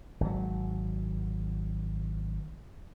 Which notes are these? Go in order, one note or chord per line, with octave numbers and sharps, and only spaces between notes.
G#1 F#3